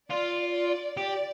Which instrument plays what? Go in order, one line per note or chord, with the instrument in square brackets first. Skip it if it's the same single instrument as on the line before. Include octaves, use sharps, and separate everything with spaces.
[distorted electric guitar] F4 [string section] D5
[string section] D5
[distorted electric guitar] G4 [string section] D5